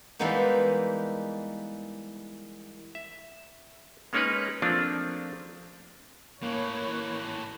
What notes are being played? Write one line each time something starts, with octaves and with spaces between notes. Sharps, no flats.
E3 G3 G#3 A#3 B3 D#4
E5
G#3 A#3 C#4 D#4 A#4 B4
F3 A3 A#3 C4 D4 F4
A2 E3 A#3 C#5